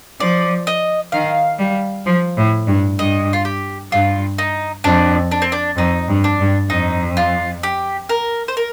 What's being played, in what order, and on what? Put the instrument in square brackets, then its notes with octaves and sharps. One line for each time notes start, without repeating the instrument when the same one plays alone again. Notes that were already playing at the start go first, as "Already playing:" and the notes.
[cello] F3 [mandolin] D5
[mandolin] D#5
[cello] D#3 [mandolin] F5
[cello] G3
F3
A2
G2
[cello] G2 [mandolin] D#5
[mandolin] F4
G4
[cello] G2 [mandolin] F4
[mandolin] D#4
[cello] F2 [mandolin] D4
[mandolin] D4
C4
D4
[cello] F2 [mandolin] D#4
[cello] G2
[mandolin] D4
[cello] G2
[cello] F2 [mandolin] D#4
[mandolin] F4
G4
A#4
C5
A#4